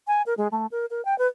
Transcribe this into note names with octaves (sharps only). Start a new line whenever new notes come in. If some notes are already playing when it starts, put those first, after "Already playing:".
G#5
A#4
G#3
A3
A#4
A#4
G5
B4